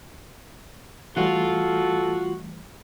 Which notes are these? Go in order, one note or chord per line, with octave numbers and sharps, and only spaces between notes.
E3 G3 A3 F4 F#4 A4